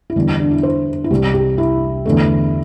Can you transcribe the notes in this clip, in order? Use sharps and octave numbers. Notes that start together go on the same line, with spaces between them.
E4
E2 D3 G3 D4
D4
E4
C5
E4
C2 C3 G3 G4
G4
E4
E2 D3 A3